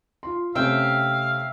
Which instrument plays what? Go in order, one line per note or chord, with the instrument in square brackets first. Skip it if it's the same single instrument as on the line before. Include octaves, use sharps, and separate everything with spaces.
[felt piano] F4 C6
[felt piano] C3 A3 C#4 [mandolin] E5 G5 [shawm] F5